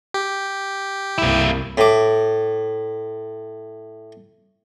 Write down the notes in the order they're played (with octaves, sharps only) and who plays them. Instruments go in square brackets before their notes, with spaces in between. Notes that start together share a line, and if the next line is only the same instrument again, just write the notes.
[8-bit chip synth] G4
[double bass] C2 [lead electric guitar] A#3 E4
[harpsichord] A2 D6